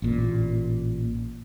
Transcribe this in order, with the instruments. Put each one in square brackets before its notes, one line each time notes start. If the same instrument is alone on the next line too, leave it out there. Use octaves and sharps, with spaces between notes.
[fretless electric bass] A1 A#2